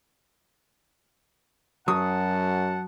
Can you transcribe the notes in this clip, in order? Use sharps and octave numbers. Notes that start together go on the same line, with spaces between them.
F#2 F#3 F#5 A5 D#6